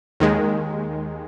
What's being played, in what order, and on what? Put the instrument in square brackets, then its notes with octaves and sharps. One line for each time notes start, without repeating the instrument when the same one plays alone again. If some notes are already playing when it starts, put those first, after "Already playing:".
[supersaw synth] D#2 D#3 G#3